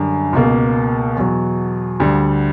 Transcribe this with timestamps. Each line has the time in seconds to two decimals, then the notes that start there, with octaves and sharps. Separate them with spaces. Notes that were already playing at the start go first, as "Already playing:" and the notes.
Already playing: F#2 D3 G3
0.33 C#2 B2 A#3
1.16 E2 B2 F#3
2.00 D2 D3 G3